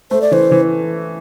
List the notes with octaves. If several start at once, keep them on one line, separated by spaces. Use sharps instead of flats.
A3 C5
D5
E3 C5
E3